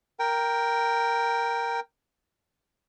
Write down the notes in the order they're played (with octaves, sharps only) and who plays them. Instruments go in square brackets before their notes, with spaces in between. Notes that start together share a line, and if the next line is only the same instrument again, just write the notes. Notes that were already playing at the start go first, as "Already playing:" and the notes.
[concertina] A#4 G5